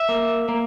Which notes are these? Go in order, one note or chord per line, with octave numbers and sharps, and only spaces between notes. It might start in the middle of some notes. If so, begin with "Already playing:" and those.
Already playing: E5
A#3
A#3